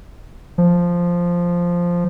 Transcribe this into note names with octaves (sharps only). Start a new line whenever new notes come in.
F3